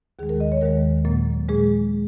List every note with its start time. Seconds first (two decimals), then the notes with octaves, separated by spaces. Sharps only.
0.19 D#2 D#3 G#3 G#4
0.29 A#4
0.40 D#5
0.52 C#5
0.61 D#2 D#3 G#3 A#4
1.05 A#2 F#3 A#3
1.49 A#2 G#3 G#4